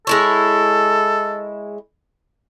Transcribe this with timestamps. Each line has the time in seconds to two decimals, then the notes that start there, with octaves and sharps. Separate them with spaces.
0.07 G#3 E4 A4 C#5